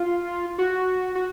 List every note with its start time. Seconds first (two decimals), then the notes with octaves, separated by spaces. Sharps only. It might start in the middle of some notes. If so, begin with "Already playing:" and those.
Already playing: F4
0.58 F#4
1.15 F#4